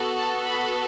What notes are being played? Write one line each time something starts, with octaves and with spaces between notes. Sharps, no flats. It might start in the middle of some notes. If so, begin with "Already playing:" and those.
Already playing: B3 F#4 A4
A5
B5